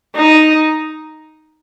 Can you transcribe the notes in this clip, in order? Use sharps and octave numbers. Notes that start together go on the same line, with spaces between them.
D#4